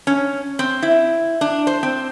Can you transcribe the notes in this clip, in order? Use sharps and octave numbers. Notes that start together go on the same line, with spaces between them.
C#4
C4
E4
D4
C5
C4